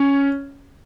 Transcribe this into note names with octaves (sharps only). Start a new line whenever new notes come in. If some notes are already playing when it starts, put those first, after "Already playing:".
Already playing: C#4